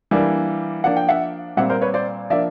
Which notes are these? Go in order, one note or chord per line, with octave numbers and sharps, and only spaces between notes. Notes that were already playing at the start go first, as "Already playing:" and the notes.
E3 G3 A#3 D4
F3 A#3 D4 F#5
G5
E5 F#5
A#2 G3 C4 E5 F#5
A#4 C5
B4 C#5
C5 D5
F3 A#3 D4 D5 E5